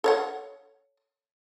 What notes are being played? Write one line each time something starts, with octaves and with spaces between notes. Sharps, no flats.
A4 C#5 F#5